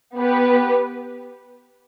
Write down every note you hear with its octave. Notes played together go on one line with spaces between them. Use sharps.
B3 G4 B4